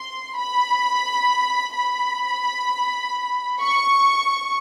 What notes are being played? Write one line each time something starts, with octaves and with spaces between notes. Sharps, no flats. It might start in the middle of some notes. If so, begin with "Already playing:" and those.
Already playing: C6
B5
B5
C#6